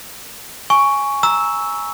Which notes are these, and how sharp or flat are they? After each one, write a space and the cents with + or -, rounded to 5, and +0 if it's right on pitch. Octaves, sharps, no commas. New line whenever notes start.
G#5 +0 C#6 +5
A#5 +0 E6 -10